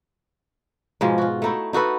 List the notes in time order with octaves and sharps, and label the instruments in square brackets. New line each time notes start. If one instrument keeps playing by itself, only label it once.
[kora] G#2 B2 F3 G#3
F4 F#4
A3 D#4 E4
D#4 F#4 A4 B4